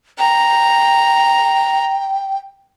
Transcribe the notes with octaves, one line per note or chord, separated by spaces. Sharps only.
G5 A#5